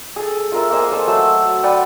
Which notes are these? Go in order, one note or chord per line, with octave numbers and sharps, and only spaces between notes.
G#4 A4
F4 A#4 E5
A#3 C5 D#5 G#5
A4 C5 F5
F#3 A3 E6
B4 D5 F#5 G5